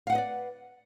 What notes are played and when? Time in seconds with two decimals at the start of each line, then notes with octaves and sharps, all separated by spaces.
0.07 F5
0.10 F#5
0.12 B4
0.15 D#5
0.18 D5